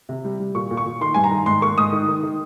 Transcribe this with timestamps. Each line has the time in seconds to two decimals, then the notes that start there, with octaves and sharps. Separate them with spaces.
0.09 C3
0.25 G3
0.40 G3
0.55 A#2 C#6
0.71 A#2
0.77 C#6
0.86 A#2
1.01 D#3 C6
1.14 G2 G#5
1.24 A#5
1.31 D#3
1.46 G#2 C6
1.62 A#3 C#6
1.78 G#2 D#6
1.92 D#3
2.08 D#3
2.23 D#3